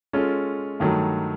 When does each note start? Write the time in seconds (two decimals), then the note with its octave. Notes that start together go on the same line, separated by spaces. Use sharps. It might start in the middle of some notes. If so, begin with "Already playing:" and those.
0.13 G#3 C#4 F4 A4
0.80 G2 D#3 F#3 A3